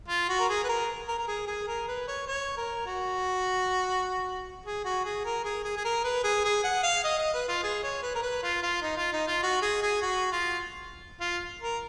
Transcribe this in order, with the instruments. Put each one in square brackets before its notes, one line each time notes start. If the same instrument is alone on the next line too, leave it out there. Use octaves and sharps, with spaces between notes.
[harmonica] F4
F#4
A#4
G#4
B4
A#4
A#4
A#4
G#4
G#4
A#4
B4
C#5
C#5
A#4
F#4
G#4
F#4
G#4
A#4
G#4
G#4
G#4
A#4
B4
G#4
G#4
F#5
F5
D#5
D#5
B4
F4
G#4
C#5
B4
A#4
B4
F4
F4
D#4
F4
D#4
F4
F#4
G#4
G#4
F#4
F4
F4
A#4